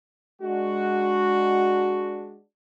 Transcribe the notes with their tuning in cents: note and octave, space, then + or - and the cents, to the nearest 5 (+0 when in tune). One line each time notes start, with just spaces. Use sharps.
G#3 +0 D4 +0 F#4 +0